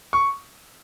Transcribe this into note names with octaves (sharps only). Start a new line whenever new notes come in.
C#6